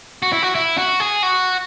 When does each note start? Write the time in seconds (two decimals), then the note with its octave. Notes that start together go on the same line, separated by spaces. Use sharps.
0.23 F#4
0.33 E4
0.43 F#4
0.55 E4
0.78 F#4
1.00 G#4
1.23 F#4